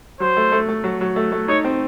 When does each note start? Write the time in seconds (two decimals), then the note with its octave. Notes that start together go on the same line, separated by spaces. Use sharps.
0.20 F#3 C5
0.37 A3
0.52 A3
0.69 A3
0.84 F#3
1.01 F#3
1.16 A3
1.32 A3
1.48 D#4 C#5
1.64 C4